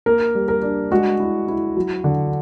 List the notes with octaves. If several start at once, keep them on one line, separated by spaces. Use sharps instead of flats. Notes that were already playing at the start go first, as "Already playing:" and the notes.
A#3 A#4
G3
A#4
D4
G#3 F#4
E4
E4
F#3
D3